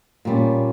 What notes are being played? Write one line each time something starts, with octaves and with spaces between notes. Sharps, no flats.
A#2 G3 C#4